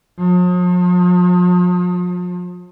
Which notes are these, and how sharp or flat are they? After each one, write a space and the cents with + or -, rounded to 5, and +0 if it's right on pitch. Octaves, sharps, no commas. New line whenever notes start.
F3 +40